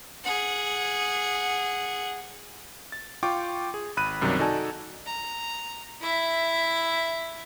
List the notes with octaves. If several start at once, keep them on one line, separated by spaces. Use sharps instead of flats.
G#4 F#5
A6
F4 G5 C#6 D6
G#4
G#1 B5 F#6 D#7
B1 F#2 C3 D#3 F#3 G3
D#4 F#4 A4 D5 G#5 A5
A#5
E4 E5